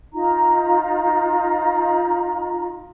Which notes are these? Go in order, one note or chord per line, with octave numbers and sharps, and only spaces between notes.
D#4 F4 A#5